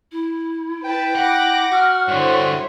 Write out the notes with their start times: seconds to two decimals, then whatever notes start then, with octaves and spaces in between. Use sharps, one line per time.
0.12 E4
0.84 B4 G5 A5
1.16 F#5 B5 D6 A#6
1.71 F#4 F6
2.08 G2 D3 E4 C5 C#5 C#6